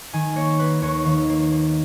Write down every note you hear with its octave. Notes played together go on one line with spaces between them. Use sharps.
D#3 G#5
A#3 C#5
A#3 B4
D#2 C#5
D#3 F5
A#3
A#3